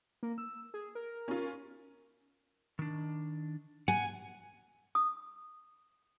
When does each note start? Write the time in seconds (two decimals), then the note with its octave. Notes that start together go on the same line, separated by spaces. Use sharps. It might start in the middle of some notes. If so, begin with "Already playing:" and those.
0.23 A#3
0.38 E6
0.74 G#4
0.95 A#4
1.28 C#4 F4
2.79 D#3 D4
3.88 F#5 G#5
4.95 D#6